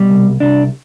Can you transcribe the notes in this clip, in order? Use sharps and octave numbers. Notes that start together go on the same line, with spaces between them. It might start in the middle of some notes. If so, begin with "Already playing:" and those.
Already playing: B2 G3
C2
C2 D4